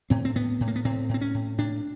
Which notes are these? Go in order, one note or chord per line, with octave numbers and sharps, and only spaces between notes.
A2 C4
C4
A2 B3
A2
A#3
B3
A2 C4
A2
C4
C#4
A2
A2 D4